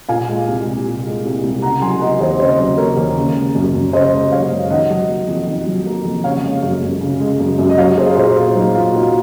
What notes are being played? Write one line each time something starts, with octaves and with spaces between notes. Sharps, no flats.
A#2 F5 G#5
G#3
C2
C2
A#2
G#3
C2
C2
C#3 F#5 A#5
F#3 G#5 C6
A#3 D#5 F#5
D#2 C5 D#5
C#3 C5 D#5
F#3
A#3 A#4 C#5
D#2
C#3
G#3
F#2
F#2
C#3 C5 D#5
G#3
F#2 C#5 F5
F#2
D#3 D#5 F#5
F#3
A#3
F2
D#3
F#3
A#3
F2
C#3 C#5 F5
G#3
F#2
F#2
C#3
G#3
F#2
F#2
D#5
F#3 C#5 F5
A#3 G#4 C5
A#2 G#4 C5
A#2 F4
F#3 D#4
A#3 F4
A#2 D#4 F#4